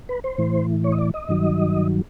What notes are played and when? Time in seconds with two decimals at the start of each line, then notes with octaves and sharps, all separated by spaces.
0.09 B4
0.24 C5
0.38 A2 E3
0.84 C#5
0.92 D#5
0.99 D5
1.14 D#5
1.29 G2 D#3 F#3